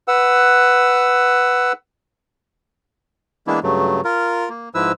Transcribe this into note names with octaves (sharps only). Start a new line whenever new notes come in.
B4 F#5 E6
E3 G#3 A#3 B3 D4 E4
G2 C#3 F#3 A3
F4 A#4
A#3
G#2 F3 E4 B4 E6